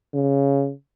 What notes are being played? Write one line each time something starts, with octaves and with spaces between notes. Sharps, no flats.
C#3